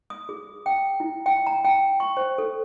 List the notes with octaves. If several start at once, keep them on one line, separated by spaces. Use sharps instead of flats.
D#6
G#4
G5
E4
G5
A#5
G5
C#6
C5
A4